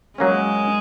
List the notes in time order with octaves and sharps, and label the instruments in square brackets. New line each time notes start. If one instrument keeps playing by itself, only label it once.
[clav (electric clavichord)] F#3 A#3 C#4 [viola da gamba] G#3